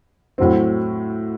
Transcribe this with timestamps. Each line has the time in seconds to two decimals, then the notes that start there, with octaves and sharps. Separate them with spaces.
0.38 A2 F#3 C4